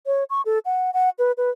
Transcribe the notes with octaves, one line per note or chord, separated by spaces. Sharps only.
C#5
C#6
A4
F#5
F#5
B4
B4